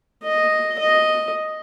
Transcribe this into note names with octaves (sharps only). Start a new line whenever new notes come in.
D#5
D#5